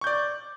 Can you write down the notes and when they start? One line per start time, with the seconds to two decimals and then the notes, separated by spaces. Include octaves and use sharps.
0.01 C#6
0.04 G6
0.07 D5